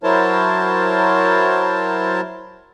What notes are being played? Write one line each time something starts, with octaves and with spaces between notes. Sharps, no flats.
F#3 E4 A#4 C5 C#5 A5